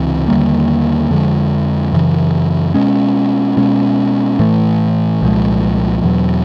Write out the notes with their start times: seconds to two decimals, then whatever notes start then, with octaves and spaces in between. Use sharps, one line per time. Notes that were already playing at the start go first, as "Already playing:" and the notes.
Already playing: C#2 C3 E3
0.28 D#2 D3 G3 A#3
1.10 F2 D3 F3 G#3
1.93 F#2 C#3 E3
2.74 B2 G#3 C#4
3.57 B2 G#3 C#4
4.39 A2 E3 A3
5.22 C2 A#2 F3 G#3
6.04 E2 B2 F#3